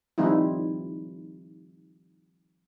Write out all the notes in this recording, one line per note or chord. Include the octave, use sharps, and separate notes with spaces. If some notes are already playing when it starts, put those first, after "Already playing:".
D#3 F3 G3 C4 D#4 E4